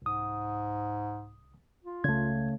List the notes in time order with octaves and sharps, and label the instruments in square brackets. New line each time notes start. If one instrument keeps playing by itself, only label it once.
[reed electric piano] C2 D#6 [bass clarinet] G#2
[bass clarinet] F4
[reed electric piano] C#2 G#6 [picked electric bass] C#3 A3